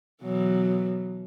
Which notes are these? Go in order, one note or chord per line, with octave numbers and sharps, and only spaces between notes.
B2 E3 F#3